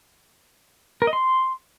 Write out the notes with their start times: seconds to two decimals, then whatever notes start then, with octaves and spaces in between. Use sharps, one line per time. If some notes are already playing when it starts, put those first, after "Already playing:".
1.02 A#4
1.07 D#5
1.13 C6